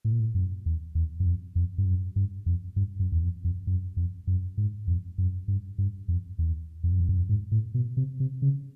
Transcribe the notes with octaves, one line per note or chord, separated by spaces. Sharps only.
A2
A#2
A2
F#2
E2
E2
F#2
F2
F2
G2
F#2
G2
F2
G2
F#2
E2
F2
F2
F#2
F2
F#2
G#2
F2
F#2
G2
G2
F2
E2
F2
F#2
F2
F#2
F2
G#2
A2
B2
C3
C3
C#3